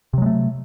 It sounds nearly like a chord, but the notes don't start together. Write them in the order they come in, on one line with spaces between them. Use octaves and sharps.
C3 F#3 G#3 A3